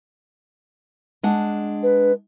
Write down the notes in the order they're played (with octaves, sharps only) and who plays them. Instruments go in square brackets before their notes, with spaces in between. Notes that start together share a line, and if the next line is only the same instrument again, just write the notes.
[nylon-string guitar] G#3 D4 F#5
[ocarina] B4